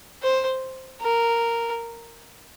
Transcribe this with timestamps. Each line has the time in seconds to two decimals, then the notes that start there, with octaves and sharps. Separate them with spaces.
0.23 C5
1.01 A#4